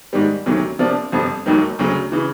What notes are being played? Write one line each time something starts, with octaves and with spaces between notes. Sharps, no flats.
G#2 D#3 G3
D2 C3 D#3 F#3
C3 F3 A#3 D4
G1 F2 C3 F3
E1 D#2 D#3 F#3
D2 C#3 F#3
C#3 E3